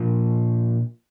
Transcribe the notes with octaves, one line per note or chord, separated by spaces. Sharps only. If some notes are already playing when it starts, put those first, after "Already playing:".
Already playing: A#2 F3